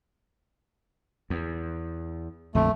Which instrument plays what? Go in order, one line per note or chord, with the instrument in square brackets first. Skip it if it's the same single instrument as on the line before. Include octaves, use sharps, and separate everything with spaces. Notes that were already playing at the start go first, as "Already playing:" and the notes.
[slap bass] E2
[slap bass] A#1 F2 D3 [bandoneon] A3